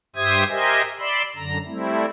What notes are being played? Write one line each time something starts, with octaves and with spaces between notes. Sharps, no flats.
G2 G4 C5 E5 D#6 G#6
G4 A#4 C5 D#5 E5 G#5
D5 B5 C6 E6
F#2 D3 A#5
G3 A3 C4 E4